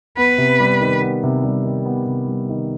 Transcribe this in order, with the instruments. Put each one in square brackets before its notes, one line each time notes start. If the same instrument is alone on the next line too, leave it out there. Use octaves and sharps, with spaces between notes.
[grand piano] B3 [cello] B4
[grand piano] C3
G3
D#3
B3
C3
G3
D#3
B3
C3
G3
D#3